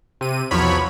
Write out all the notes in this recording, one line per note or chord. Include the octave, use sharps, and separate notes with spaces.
C3 D#7
B1 E2 F3 F#3 C#5 B5